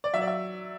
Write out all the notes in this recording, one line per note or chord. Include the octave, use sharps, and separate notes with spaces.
D5
F#3 E5
D5
E5